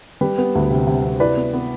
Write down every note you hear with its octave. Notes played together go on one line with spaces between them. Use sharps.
G3 G4 B4
B3
D2
C3
C3
C3
E4 B4 D5
B3
B3